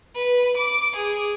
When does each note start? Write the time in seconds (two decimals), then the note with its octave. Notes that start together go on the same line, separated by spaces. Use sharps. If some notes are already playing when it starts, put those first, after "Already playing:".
0.15 B4
0.57 D6
0.95 G#4